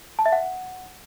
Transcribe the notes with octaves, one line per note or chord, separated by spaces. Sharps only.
A5
E5
F#5